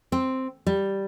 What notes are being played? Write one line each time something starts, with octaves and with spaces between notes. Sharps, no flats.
C4
G3